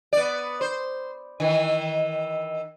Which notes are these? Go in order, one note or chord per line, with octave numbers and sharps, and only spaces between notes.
B3 D5
C5
D#3 E3